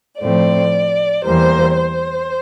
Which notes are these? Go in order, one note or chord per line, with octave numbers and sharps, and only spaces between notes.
A2 F3 A3 C4 D5
E2 E3 G3 A#3 C5
C5